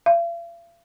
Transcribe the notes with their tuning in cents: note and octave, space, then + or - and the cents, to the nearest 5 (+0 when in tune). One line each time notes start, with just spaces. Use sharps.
F5 -45